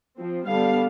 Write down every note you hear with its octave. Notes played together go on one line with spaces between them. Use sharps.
F3 C4
D3 G3 B3 D4 F5